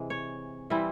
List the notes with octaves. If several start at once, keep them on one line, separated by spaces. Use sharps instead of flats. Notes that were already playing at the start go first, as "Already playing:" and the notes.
Already playing: C3 E3 G#3
C#5
E3 G3 C4 E4